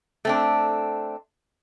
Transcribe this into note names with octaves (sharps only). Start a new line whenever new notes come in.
A3 C4 D4